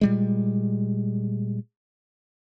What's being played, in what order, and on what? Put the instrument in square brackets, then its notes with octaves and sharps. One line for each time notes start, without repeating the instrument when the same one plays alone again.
[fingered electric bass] A#2 G3 G#3